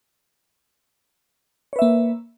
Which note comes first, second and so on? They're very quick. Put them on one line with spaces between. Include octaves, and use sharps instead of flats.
C#5 B4 E5 A#3